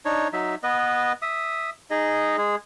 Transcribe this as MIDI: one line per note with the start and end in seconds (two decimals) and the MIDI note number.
0.05 0.28 62
0.05 0.28 63
0.05 0.28 73
0.33 0.55 54
0.33 0.55 63
0.33 0.55 76
0.63 1.13 59
0.63 1.13 71
0.63 1.13 75
1.22 1.70 76
1.22 1.70 87
1.91 2.37 63
1.91 2.37 68
1.91 2.37 75
2.37 2.55 56
2.37 2.55 68